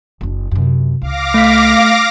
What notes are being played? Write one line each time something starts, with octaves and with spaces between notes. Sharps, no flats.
F#1 D4
F#2 C3
C#2 F5 D6 A#6
A3 B6